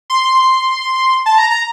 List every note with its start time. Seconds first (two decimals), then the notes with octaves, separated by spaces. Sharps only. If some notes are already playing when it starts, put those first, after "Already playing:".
0.10 C6
1.26 A5
1.38 A#5
1.50 A#5